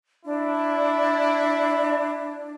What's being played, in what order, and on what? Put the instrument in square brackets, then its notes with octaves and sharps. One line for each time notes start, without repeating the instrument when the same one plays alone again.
[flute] D4 [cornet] E4